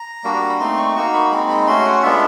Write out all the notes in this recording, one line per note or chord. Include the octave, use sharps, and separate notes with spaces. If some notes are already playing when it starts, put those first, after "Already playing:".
Already playing: A#5
G3 A#3 D4 F#4
B5
A3 C4 D#4 C6
C#6
A#3 D#4 F#4 C#6
B5
G#3 C4 D#4 B5
B5
A3 C#4 F#4 C6
F#5
G#3 B3 D4 F4 E5